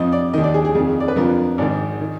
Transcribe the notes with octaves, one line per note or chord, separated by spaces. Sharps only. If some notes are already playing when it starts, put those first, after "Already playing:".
Already playing: F2 F3 D#5
D5
D#2 D#3 D#5
D5
G#4
G#4
F2 D#3 G#4
D5
B4
F2 D3 F3 A#4
G#1 G#2 D#3 D5
D#3